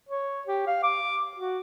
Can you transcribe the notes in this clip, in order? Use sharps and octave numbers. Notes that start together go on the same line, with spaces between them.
C#5
G4
F5
D6
F#4